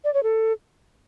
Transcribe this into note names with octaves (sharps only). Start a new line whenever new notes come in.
D5
C#5
A4